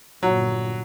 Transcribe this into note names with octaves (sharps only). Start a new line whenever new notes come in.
G1 A#2 F#3